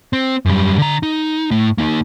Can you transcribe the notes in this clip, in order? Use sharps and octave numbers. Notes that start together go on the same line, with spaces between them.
C4
F#2 G3
D3 A#5
D#4
A2
A#3 D#4